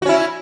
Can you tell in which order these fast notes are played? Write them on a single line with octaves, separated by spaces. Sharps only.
F#4 C#4 E4